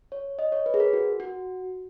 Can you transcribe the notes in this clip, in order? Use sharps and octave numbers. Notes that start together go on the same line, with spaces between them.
C#5
D#5
C#5
B4
G#4
A#4
F#4
F#4